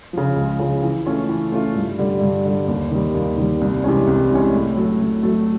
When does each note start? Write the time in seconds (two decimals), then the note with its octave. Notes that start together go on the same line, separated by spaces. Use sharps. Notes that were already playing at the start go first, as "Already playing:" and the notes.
0.13 C#3 F3
0.36 C#2
0.59 C#3 F3
0.83 E3
1.06 A3 C#4 F4
1.29 E3
1.52 A3 C#4 F4
1.75 G2
1.99 D3 G3
2.21 G2
2.45 D3 G3
2.68 D#2
2.91 D#3 G3
3.15 D#2
3.37 D#3 G3
3.61 C2
3.84 C3 E3 G#3 C#4
4.07 C2
4.31 C3 E3 G#3 C#4
4.54 A2
4.77 F#3 A3
5.00 A2
5.23 F#3 A3